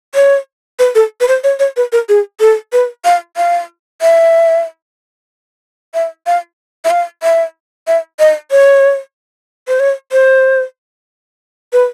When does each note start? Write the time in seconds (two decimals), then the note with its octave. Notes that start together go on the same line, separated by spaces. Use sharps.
0.15 C#5
0.79 B4
0.95 A4
1.21 B4
1.28 C5
1.44 C#5
1.59 C#5
1.77 B4
1.92 A#4
2.09 G#4
2.40 A4
2.73 B4
3.05 F5
3.37 F5
4.02 E5
5.94 E5
6.26 F5
6.85 E5
6.91 F5
7.23 E5
7.87 E5
8.20 D#5
8.51 C#5
9.68 C5
9.80 C#5
10.12 C5
11.73 B4